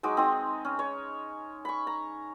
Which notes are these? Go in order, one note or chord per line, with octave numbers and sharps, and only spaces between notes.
F#3 G#3 D#4 D6
C4 D#4 D#6
C#4
C#5
B5 C#6
A#5